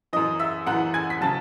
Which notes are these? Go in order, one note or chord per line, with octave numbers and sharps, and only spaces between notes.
F#2 E3 D#5 D#6
E5 E6
F#2 E3 F#5 F#6
G#5 G#6
B6
C#3 F#3 A5 A6